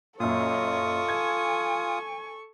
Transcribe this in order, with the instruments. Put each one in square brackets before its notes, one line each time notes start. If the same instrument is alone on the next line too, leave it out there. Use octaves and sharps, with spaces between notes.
[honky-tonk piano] F#2 A#2 [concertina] F4 D#6 [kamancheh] A4 C#6 [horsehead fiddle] C#5 D#5
[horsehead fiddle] G#5 [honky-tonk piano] G#6